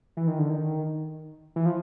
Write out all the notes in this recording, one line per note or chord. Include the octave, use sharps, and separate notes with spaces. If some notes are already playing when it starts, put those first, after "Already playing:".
E3
D#3
D3
D#3
E3
F3